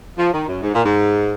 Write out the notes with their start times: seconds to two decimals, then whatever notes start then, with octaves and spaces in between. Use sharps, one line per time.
0.18 F3
0.33 D#3
0.47 F#2
0.62 G#2
0.74 A#2
0.84 G#2